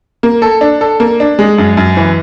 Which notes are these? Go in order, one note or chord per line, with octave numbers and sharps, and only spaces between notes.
A#3
A4
D4
A4
A#3
D4
G#3
F#2
F#2
E3